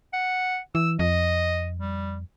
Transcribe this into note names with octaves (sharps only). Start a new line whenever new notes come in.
F#5
E3 E6
F2 D#5
G3